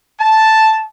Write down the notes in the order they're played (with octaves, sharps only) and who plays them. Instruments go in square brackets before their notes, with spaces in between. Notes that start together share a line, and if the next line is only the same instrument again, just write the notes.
[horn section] A5